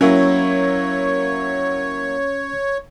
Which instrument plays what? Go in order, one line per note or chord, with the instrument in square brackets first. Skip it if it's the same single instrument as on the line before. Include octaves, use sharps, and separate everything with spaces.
[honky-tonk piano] F#3 A#3 E4 [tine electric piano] C#4 [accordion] C#5